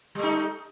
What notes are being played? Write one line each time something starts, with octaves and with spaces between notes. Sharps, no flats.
G3 A3 D#4